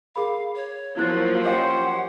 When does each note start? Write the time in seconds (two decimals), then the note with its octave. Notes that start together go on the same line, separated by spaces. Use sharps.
0.16 G#4 A#4 F5 B5
0.55 C#5
0.97 F3 F#3 A#3 E4 F#6 A6
1.44 C#4 G4 C5 C#5 D#5 F5 F#5